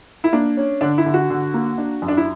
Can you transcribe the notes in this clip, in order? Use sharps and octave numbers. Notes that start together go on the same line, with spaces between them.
E4
A#3 D4
C#4
D3 D4
E4
D3
F#4
D3
A#3
D4
F#2
D4
E4